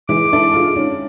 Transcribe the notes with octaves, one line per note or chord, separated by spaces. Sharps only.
E3 G#3 D6
D4 E4 A4
G#3 F4
D#3 C#4 D4